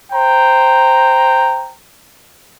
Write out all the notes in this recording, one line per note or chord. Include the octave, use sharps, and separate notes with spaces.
C5 G5 A#5